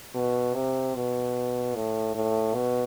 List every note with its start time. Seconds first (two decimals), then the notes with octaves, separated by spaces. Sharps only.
0.14 B2
0.54 C3
0.95 B2
1.75 A2
2.15 A2
2.54 B2